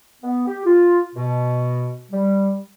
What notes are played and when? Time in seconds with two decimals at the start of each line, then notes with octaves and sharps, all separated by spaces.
0.22 B3
0.47 G4
0.66 F4
1.16 B2
2.12 G3